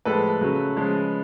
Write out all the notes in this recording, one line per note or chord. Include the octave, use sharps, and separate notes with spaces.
A2 F3 G#3 A4 B4
C#3 F#3 A3
C#3 F3 G#3